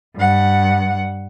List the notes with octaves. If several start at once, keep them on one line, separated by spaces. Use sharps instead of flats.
G2 F#5